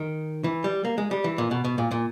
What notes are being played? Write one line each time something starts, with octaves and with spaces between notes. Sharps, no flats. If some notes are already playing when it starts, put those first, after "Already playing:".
Already playing: D#3
E3
G3
A#3
G#3
G3
E3
A#2
B2
B2
A#2
A#2